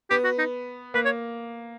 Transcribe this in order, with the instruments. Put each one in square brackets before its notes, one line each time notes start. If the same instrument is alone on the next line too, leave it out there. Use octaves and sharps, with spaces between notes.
[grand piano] B3 [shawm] G4
[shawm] F#4
D#4
[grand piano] A#3 [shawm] B4
[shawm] C#5